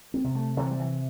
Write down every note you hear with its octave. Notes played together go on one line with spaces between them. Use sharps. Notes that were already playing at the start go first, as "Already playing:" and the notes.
C4
C3
A3
C3 E3
G3
E3